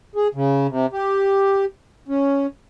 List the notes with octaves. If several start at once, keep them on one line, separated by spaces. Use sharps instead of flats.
G#4
C#3
C3
G4
C#4